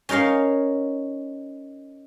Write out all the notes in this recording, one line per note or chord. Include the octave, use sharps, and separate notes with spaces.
C#4 D#4 A#4 C#5 F5